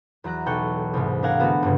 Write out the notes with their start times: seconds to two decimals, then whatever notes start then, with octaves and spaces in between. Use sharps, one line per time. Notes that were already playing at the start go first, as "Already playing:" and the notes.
0.24 E2 F#3 A#5 F#6
0.46 B1 A4 G5 C#6 F#6 G6
0.94 C2 G#2
1.23 D4 A#4 F5 F#5 G#5
1.40 D3 A3 B3 F#4
1.63 G1 G2 C#3